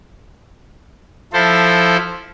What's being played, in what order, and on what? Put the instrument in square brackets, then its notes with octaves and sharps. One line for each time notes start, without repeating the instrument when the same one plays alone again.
[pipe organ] F3 E4 A4 C5